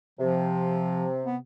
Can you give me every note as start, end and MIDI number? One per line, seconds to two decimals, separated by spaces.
0.19 1.37 48
0.19 1.06 53
1.26 1.37 59